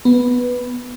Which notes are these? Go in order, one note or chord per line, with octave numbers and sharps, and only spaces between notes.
B3